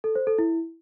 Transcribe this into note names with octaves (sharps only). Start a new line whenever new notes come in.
A4
C5
A4
E4